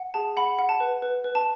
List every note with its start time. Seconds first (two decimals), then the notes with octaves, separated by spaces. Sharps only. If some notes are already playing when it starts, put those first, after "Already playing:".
Already playing: F#5
0.14 G#4 A5
0.37 F#5 B5
0.59 F#5
0.69 A5
0.80 B4
1.02 B4
1.24 B4
1.35 A5